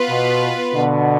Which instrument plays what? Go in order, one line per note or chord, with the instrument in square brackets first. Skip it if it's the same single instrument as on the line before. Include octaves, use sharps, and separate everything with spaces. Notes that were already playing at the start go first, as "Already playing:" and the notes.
Already playing: [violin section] B3 F4 B4
[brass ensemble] B2
B2 D3